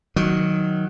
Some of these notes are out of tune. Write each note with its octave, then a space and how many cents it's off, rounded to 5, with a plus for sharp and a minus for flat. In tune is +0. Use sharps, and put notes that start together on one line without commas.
D#3 +0 F#3 +0